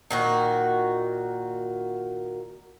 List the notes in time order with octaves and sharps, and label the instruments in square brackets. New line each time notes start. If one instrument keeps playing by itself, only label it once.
[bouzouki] A#2 D#3 F#4